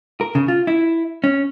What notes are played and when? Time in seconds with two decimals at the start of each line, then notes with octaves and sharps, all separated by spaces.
0.21 A#4
0.35 C#3
0.48 F4
0.67 E4
1.24 C#4